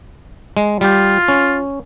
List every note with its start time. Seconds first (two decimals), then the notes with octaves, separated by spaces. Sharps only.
0.57 G#3
0.81 G3 F4 G4
1.28 C#4